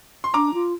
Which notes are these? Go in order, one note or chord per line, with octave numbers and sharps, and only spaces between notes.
C6
D4 A#5 D6
F4